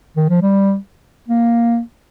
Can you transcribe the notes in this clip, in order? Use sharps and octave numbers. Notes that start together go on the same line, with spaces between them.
D#3
F3
G3
A#3